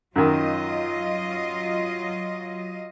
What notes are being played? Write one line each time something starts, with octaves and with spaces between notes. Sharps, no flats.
F#2 D#3 F#3 F4 D#5